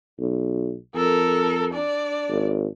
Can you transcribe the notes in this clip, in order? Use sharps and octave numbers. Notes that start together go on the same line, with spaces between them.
B1
F2 A4 A#4
D4 D5
G#1